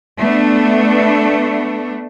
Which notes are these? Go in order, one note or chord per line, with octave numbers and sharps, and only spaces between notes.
A3 B3 D4